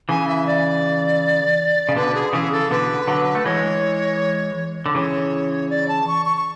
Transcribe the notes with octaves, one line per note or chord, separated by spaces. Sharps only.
C#3 E3 G#5
E5
D5
C#3
B2 D3 B4
G#4
C#3 E3 G#4
A4
B2 D3 B4
D3 F#3
A3
E3 G#3 C#5
D3
C#3 E3 C#5
D5
A5
C#6
C#6
C#6